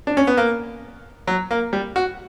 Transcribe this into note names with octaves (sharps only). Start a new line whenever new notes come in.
D4
C#4
B3
A#3
F#3
A#3
G3
F#4